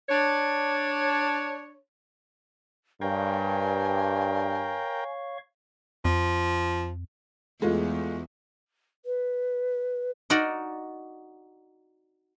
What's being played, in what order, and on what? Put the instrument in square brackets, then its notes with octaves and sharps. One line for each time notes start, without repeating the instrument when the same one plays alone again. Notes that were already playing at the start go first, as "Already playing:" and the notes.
[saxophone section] D4 C#5
[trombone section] G2 [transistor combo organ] A#4 G5 [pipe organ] C#5 F5 C#6 [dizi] G#5
[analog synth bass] F2 [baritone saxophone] F3
[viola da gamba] E2 [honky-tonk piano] G#3 A3 F4
[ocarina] B4
[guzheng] D#4 F#4 A#4 D5